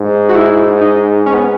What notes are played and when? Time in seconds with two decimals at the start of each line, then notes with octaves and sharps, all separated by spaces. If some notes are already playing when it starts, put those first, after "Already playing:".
Already playing: G#2
0.29 F#4
0.35 E4
0.81 D#4
1.26 C#4
1.34 B3